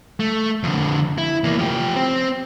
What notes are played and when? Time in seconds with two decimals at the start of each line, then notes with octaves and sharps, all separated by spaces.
0.20 A3
0.63 F2 D3
1.18 E4
1.44 E2 A#3
1.59 F3 G4
1.96 C4